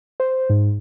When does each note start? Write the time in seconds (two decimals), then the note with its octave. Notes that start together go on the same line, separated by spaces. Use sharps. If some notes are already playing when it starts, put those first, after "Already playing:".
0.20 C5
0.49 G#2